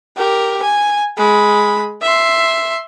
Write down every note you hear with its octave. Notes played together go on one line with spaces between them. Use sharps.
G4 A#4
G#5
G#3 B5
E5 C6